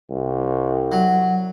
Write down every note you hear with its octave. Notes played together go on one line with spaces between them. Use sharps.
C2
F#3